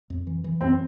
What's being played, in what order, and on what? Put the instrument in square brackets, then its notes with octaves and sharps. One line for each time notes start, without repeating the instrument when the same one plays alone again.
[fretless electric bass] F2
E3
E3
[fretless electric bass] F#2 [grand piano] C4